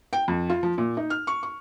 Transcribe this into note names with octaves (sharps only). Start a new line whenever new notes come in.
G5
F2
F4
F3
A#2
D#4
F6
C#6
C#6